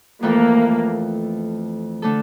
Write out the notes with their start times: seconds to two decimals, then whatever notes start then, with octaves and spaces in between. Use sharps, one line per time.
0.23 F2 E3 A3 A#3 E4 A4
2.02 D3 A3 D4 A4